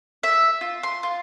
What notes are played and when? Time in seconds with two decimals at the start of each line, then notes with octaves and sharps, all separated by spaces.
0.23 E5
0.61 F4
0.83 C6
1.03 F4